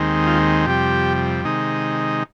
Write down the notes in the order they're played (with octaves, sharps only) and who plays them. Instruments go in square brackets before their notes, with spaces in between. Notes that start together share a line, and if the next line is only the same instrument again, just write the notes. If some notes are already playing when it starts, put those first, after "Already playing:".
Already playing: [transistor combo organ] D#2 D#3 G#3 C4
F4
F2 C3 G3 G4
C3 D#3 G#3 D#4